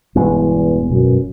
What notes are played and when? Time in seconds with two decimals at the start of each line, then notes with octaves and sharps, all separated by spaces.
0.16 E1 E2 G2 G#3 B3
0.91 F#2 B2